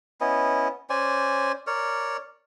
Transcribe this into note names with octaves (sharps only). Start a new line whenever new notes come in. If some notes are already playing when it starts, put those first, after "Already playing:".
B3 C#4 E4 D#5
C#4 C5 D5 G#5
A#4 C#5 D5